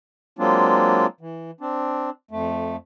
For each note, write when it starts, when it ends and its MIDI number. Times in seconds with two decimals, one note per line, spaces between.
0.39 1.07 54
0.39 1.07 56
0.39 1.07 58
0.39 1.07 60
0.39 1.07 62
0.39 1.07 65
1.21 1.51 52
1.61 2.10 60
1.61 2.10 62
2.31 2.76 41
2.31 2.76 57